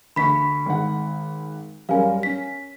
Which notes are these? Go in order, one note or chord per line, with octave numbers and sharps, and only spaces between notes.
D2 B5 C#6 B6
G#1 F#5
F#2 G3 A#4 F5 G#5
C#4 B6